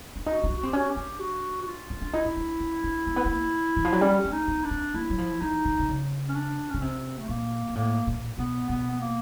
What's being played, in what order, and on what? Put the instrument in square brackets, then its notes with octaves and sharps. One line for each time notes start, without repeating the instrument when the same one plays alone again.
[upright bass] D4
[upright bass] D#4 [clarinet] F#4
[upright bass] D#4
D4
[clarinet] F#4
[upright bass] C4 [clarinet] G4
[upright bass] C#4 [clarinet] F#4
[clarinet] G4
[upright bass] D4
[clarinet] F#4
F#4
F4
[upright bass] C#4
D4
[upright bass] D#4 [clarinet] E4
[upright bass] D#4
D4
C#4
D4
A#3
B3
A#3
E3
F3
F#3
[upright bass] G3 [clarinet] C#4
[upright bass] A3
[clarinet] D#4
[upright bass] B3
[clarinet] D4
[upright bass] C4
[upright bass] A#3 [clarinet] E4
[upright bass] F#3
F3
[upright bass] E3 [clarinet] D#4
[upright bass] D#3
C3
C#3
[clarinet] C#4
D4
[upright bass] C#3 [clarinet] C#4
[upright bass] C3 [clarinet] C4
[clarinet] A3
[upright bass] A#2 [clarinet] A#3
[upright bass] A#2
[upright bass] A2 [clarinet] A#3
[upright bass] A#2
[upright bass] B2 [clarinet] B3
[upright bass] B2 [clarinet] B3
[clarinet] B3
A#3